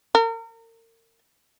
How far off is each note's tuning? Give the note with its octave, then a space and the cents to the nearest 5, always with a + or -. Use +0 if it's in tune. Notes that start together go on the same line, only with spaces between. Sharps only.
A#4 -35